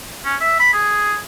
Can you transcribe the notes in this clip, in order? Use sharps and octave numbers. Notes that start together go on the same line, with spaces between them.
C#4
E5
B5
G#4